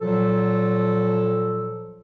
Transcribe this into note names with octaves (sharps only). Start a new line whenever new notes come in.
A#2 F3 F#3 A4